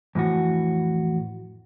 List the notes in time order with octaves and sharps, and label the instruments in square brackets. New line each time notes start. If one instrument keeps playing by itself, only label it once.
[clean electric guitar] F2 A2 E3 F#4